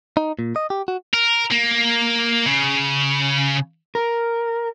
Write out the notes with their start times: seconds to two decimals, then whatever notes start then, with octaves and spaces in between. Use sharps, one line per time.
0.17 D#4
0.39 A#2
0.56 D#5
0.70 G4
0.88 F#4
1.13 A#4
1.51 A#3
2.46 C#3
3.95 A#4